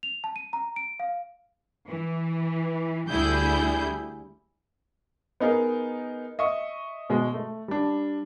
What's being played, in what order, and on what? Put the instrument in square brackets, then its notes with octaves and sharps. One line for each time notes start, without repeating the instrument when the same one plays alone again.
[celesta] F7
A5
D#7
A#5
D7
F5
[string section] E3
D2 D3 G3 E4 G#4 G6
[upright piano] B3 D#4 G#4 A#4
D#5 E5 C#6
B2 G#3
A3
G3 D4